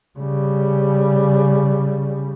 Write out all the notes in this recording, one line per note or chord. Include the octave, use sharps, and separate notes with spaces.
C#3 G3